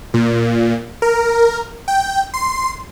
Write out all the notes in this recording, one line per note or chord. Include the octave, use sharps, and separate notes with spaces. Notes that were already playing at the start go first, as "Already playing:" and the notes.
A#2
A#4
G5
C6